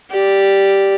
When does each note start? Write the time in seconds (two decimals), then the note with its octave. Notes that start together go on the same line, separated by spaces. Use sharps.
0.11 G4 D5